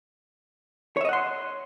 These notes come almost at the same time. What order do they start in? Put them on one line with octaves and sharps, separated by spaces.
C#5 E5 D#5 F#5 C6